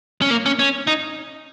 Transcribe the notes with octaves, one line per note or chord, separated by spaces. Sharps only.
C#4
A#3
C#4
C#4
D#4